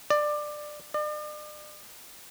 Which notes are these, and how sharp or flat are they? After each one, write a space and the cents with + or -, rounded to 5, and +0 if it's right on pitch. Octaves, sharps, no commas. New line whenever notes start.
D5 +20
D5 +45